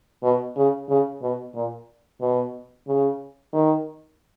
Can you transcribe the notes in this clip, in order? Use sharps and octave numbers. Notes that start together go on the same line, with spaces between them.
B2
C#3
C#3
B2
A#2
B2
C#3
D#3